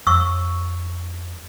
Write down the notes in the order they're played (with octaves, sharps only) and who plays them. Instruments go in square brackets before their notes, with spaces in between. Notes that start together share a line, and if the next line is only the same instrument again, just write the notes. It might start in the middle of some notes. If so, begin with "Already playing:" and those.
[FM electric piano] F2 [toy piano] C#6 E6